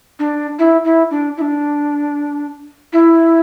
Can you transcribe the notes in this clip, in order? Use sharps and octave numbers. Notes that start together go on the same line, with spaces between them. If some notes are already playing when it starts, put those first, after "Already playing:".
D4
E4
E4
D4
E4
D4
E4